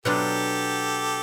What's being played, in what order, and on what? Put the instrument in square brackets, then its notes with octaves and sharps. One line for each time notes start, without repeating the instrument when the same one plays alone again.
[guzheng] B2 F#3 B3 D4 F4 [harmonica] G4 A4